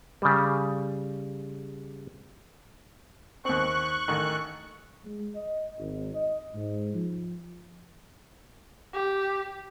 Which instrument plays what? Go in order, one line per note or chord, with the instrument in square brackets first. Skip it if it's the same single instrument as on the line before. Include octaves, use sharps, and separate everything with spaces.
[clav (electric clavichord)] C#3 G3
[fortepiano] D#2 C4 [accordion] C#6 F#6
[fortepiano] A1 D#3
[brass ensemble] G#3
D#5
G#1
D#5
G#2
F3
[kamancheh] G4